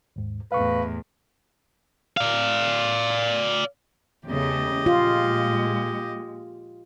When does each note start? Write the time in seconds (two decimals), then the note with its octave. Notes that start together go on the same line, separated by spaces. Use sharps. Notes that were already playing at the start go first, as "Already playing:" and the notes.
0.16 D#2 G#2
0.52 E2 A2 B4 F5 C#6
2.17 D5 F5
4.28 E2 C#3 A3 G4 D#5
4.86 A#2 G#3 F4